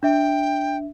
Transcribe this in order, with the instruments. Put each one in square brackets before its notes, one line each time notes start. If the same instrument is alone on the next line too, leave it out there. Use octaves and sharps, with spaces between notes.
[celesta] D4 E5 [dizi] G5